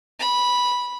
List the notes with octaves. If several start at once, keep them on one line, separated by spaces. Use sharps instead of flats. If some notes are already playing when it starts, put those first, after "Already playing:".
B5